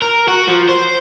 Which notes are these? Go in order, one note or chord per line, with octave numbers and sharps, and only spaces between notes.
A#4
F#4
F3
C5